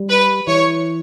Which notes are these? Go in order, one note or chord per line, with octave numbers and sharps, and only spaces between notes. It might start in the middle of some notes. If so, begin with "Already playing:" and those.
Already playing: G3
B4
E3 C#5